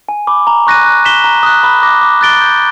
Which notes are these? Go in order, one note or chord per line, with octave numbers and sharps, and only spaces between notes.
G#5
B5 D6
A#5
C#6 F#6 A#6 D#7
F#6
B6 E7 G7
A#5
D#6 F#6
B5
D6 F#6 A#6
D6
F#6 A6 D7 G7
G6